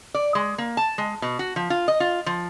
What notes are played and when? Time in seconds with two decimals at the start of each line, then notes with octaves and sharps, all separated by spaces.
0.14 D5
0.35 G#3
0.58 A#3
0.77 A5
0.98 G#3
1.22 B2
1.39 F#4
1.56 F3
1.70 F4
1.88 D#5
2.00 F4
2.26 F3